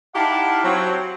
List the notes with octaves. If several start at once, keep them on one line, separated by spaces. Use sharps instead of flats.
D#4 E4 G4 F5 F#5 A5
F#3 C4